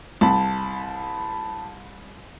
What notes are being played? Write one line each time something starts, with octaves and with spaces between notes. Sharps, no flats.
C2 A5 B5